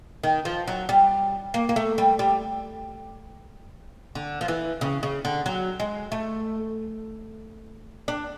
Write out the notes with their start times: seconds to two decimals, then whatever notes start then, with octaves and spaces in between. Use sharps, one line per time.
0.23 D#3
0.45 F3
0.68 F#3
0.89 G3
1.54 A#3
1.69 A#3
1.76 A3
1.98 G3
2.19 G3
4.15 D3
4.41 F3
4.48 E3
4.81 C#3
5.03 C#3
5.25 D3
5.46 F#3
5.80 G#3
6.12 A3
8.08 D4